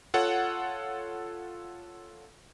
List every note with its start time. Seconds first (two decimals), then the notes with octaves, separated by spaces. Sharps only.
0.14 F4 A4 C#5 F#5